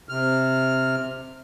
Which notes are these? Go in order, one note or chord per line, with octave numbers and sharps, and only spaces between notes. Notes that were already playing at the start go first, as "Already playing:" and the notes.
C3 F6